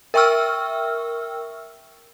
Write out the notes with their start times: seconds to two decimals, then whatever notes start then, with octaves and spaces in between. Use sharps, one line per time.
0.14 A#4 E5 G5 C#6 E6 F6